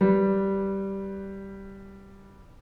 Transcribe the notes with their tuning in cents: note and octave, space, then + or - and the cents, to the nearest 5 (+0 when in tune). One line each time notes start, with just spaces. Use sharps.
G3 -5 B4 +0